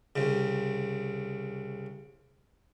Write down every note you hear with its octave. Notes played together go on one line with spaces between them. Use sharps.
C2 C#3